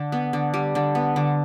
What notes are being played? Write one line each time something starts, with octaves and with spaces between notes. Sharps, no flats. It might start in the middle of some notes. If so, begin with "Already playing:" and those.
Already playing: D3
B3
D3
G3
D3
B3
D3